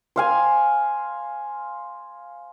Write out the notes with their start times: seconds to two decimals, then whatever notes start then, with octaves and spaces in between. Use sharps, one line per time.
0.16 C5 F5 G#5